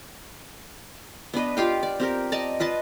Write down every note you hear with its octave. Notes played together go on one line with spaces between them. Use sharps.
B3 D4 B4 D#5
F4 G4 F5 G5
D5
C4 G4 A#4
D5 D#5 A5 A#5
F4 B4 D#5 A5